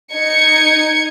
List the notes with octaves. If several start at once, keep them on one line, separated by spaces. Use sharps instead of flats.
D#4 G#6 C#7